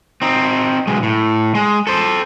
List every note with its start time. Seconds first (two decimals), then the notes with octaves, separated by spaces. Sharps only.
0.22 C4 D#4
0.87 B1 G#3
1.03 A2
1.55 G#3
1.87 A4 C5